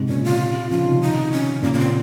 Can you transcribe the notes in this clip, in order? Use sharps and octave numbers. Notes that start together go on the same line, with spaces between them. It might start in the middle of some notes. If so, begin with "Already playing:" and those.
Already playing: G#2 C3
A#2 C#3 C#4
F4
C#3 F3 F4
C3 D#3
D#4
C#4
A#2 C#3 A#3
A#3
C4